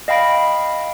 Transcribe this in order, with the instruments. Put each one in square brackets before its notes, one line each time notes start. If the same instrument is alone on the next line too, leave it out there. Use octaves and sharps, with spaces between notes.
[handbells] D#5 F5 G5 B5 A#6 D7